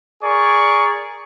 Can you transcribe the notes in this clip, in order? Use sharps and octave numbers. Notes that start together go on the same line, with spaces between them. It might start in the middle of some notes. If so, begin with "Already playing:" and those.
G#4 A#4 D5 C#6